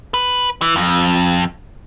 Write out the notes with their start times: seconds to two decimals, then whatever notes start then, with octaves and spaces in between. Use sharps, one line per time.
0.14 B4
0.62 E3
0.76 F2